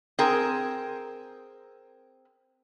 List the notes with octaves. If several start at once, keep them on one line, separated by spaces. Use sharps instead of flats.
C4 G#4 A#4